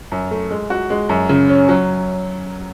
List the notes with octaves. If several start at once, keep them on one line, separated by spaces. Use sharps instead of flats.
F#2
A3
G#3
F#4
G#3
F#2
C#3
C#4
F#3